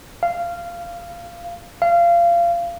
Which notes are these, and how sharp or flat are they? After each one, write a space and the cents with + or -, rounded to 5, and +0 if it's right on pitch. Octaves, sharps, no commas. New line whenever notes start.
F5 -15
F5 -25